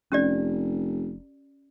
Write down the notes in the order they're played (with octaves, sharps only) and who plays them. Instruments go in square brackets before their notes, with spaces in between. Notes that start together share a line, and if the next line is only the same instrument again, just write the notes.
[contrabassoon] F1 [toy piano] C#4 G4 D5